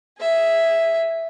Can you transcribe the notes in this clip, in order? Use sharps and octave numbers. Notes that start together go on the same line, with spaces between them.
G#4 E5